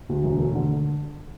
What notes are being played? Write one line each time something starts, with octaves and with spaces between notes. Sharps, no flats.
D2
E1
A3
D3